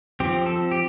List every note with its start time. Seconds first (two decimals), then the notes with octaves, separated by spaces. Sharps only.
0.20 F3 C4 G4
0.46 A4
0.71 G4